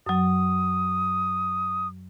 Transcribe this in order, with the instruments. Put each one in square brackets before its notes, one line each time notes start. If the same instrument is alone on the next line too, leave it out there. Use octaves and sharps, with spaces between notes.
[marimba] F#2 F#3 [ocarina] D#6